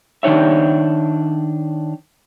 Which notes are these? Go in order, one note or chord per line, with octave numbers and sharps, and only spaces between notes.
D#3 D4 D#4 C#5 E5